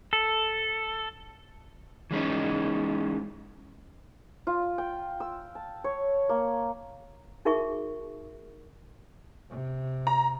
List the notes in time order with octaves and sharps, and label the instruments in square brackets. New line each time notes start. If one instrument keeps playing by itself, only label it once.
[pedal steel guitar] A4
[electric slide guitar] E3 G#3 C#4 D#4
[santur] F4
G5
E6
A5
C#5
A#3
[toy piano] D#4 F#4 G#4 A#4 E5 C#6
[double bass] C3
[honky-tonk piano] A#5